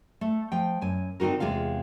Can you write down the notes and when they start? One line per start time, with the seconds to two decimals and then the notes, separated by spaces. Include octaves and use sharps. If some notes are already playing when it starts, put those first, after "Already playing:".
0.21 A3
0.52 F3 G5
0.81 F#2 G#5
1.20 D3 C4 D#4 F#4 A#4
1.40 E2 C3 G#3 F4 F5